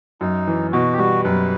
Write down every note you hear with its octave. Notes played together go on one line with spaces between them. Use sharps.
F#2 D#4
E3
B2 F#4
G4
G3 F#4
F#2 B4